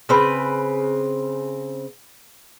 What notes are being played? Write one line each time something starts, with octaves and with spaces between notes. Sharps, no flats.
C#3 C4 B4